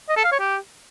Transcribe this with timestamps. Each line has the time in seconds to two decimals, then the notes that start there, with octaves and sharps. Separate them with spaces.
0.09 D#5
0.17 A4
0.24 F5
0.32 C#5
0.39 G4